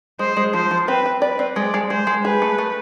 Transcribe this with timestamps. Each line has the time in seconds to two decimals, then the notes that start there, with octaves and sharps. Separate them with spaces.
0.19 G#3 C5
0.37 G#3
0.53 F3 C5
0.71 F3
0.88 C4 B4
1.06 C4
1.22 B4 D5
1.39 C4
1.56 G#3 D5
1.74 G#3
1.90 G#3 C5
2.07 G#3
2.25 G#4 B4
2.42 A3
2.58 A3